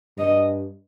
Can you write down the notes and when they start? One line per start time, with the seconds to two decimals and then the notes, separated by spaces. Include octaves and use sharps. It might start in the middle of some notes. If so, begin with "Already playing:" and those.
0.18 G2 D#5